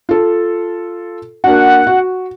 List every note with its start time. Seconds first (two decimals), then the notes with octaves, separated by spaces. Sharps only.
0.09 F4 A4
1.44 A#3 D4 F#4 F#5
1.87 F#4